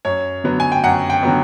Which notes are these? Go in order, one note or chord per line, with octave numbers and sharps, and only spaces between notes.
F#2 C#5
D3 F#3 B3
G#5
G5
F#2 F#5
G5
D3 F#3 B3